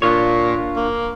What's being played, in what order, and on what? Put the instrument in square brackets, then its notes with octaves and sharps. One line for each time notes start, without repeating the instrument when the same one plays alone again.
[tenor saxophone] A#2 [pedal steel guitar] D4 F4 C#5
[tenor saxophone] A#3